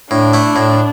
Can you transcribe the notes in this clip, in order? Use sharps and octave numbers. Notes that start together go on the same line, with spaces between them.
A2 D4
A3 E4
A2